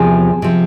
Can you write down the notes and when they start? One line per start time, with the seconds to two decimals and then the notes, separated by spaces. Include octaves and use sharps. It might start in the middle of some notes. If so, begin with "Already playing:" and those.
Already playing: E2 C3 F3 G#4
0.42 C3 F3